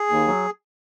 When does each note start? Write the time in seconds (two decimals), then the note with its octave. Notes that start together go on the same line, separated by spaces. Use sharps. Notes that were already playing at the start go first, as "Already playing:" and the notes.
Already playing: G#4
0.09 D#2
0.27 F#3